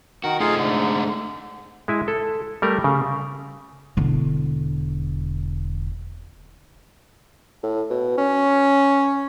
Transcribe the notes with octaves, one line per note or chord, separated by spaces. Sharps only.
D#3 F#4 A#4
A3 D#4 F4 G#4 F5
G#2 D3
G#3 E4 G#5
A4
G3 A3 A#4
C#3
E1 D3
A2
B2
C#4